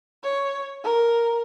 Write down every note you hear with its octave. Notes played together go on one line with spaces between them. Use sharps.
C#5
A#4